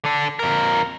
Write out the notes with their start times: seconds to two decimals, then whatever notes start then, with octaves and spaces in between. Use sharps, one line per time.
0.05 D3 D4
0.39 F2 A#4